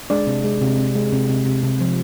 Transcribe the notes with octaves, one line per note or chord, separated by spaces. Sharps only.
G#3 D4 D5
C3
G#3
C3
C3
G#3
C3
C3
C3
C3
F3